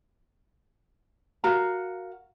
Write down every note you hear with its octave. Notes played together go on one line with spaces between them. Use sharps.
F#4 A#4 F5 A#5